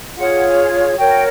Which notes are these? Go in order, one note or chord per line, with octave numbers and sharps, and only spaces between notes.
F4 G#4 C#5 F#5
F#4 A#4 C#5 G5